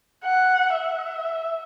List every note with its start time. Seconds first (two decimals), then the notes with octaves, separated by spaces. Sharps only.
0.24 F#5
0.74 E5